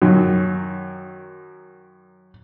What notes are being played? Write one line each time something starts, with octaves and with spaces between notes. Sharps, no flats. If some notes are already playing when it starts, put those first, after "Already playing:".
F#2 D#3 F#3